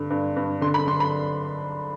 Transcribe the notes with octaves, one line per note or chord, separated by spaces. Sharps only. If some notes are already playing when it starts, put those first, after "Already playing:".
Already playing: G2 D3
G2
G2
D3 C6
B5
D3 C6
B5